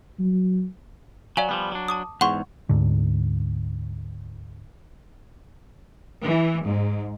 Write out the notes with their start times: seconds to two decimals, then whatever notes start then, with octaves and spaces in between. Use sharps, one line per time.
0.19 F#3
1.37 F#3 D5 F5 G#5
1.49 F3 G3 B3
1.72 F#3 D4
1.88 A5 D6 D#6
2.21 E2 G#2 F#5 C6 C#6
2.69 D2 G#2 D3
6.24 E3
6.65 G#2